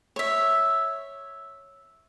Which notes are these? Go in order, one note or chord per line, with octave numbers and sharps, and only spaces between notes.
C#5 E5